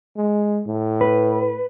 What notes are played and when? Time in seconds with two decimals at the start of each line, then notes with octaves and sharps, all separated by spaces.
0.16 G#3
0.67 A2
1.01 B4